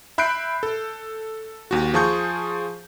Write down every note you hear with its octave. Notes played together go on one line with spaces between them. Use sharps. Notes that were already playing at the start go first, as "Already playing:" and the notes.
E5 B5 F#6 G6 C7 D7
A4
D#2 F#4
F3 F4 G#4 A5 C#6 G6